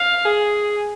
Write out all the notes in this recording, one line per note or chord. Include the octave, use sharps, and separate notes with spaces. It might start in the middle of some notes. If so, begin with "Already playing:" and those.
Already playing: F5
G#4